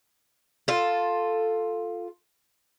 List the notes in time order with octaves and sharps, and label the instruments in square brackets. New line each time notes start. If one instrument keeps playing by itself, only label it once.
[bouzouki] F4 A4